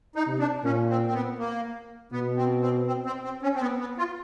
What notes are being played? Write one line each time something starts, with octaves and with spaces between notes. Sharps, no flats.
D#4
C3
D4
A#2 C#4
C4
C4
B3
A#3
B2 B3
C4
C4
C4
C4
C4
C#4
C4
B3
B3
F4